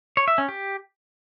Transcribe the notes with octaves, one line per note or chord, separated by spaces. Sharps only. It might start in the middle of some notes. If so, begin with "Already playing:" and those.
C#5
E5
C#4
G4